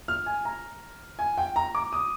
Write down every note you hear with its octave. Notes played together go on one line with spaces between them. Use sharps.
F6
G#5
A#5
G#5
G5
A#5
D6
D#6